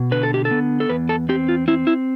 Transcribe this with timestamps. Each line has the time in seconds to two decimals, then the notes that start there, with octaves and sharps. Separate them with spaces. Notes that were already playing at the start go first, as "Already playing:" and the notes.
Already playing: B2
0.11 D3 B4
0.23 A4
0.34 G4
0.45 A4
0.51 B3
0.80 A4
0.89 E2 B4
1.09 A4
1.29 C4 G4
1.49 F4
1.68 C4 E4
1.87 E4